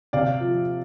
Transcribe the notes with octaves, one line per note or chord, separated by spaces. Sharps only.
C3 D5 F5
F3